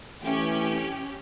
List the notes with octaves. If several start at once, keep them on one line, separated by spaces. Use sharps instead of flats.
E3 A3 C#4 G4